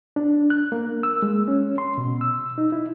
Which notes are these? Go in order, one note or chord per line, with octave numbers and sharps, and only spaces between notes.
D4
F#6
A#3
E6
G#3
C#4
C6
B2
E6
D#4
E4